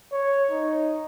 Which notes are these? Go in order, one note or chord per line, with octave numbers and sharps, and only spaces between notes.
C#5
D#4